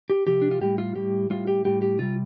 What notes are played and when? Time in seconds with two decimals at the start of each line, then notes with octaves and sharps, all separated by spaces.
0.10 G4
0.27 C3 F3 G4
0.42 D4
0.51 F4
0.61 A2 G3 G4
0.78 F4
0.95 A2 G3 G4
1.30 A2 G3 F4
1.47 G4
1.65 A2 G3 G4
1.82 G4
1.99 C3 G3 F4